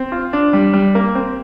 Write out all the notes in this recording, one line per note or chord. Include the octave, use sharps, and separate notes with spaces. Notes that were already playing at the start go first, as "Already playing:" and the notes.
Already playing: C4
F4
D4
G3
G3
A#3
C4